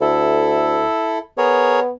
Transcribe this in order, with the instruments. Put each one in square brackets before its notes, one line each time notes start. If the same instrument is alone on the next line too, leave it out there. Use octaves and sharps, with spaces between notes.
[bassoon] D2 [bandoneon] E4 A4
[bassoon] B3 [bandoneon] G#4 A#4 C#5